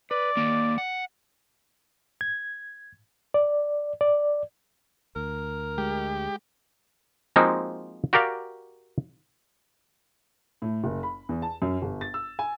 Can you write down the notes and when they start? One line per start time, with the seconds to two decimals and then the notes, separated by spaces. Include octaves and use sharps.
0.11 B4 D5
0.37 D#2 A#3
0.78 F#5
2.21 G#6
3.34 D5
4.01 D5
5.16 D2 A#4
5.78 G#3 G4
7.36 F3 G#3 A#3 C4 D#4 F#4
8.13 F#4 G4 A#4 D5 F5
10.62 A2
10.84 F#1
11.03 B5
11.29 E2
11.42 A5
11.62 F#2
11.82 G1
12.01 A6
12.14 E6
12.39 G#5